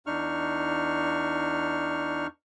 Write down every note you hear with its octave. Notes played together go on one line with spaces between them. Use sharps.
E2 D4 D#4 C#6 F6